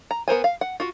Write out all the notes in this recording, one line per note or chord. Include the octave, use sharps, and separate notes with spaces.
A#5
B3 A#4 C5 G#5
F5
F#5
F4 F#4